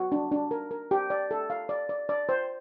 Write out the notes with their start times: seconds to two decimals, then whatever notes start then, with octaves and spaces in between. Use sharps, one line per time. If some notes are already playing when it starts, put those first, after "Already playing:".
Already playing: F#4
0.12 D4
0.32 D4
0.51 A#4
0.71 A#4
0.91 G4
1.10 D5
1.31 A4
1.50 F5
1.69 D5
1.89 D5
2.09 D5
2.29 C5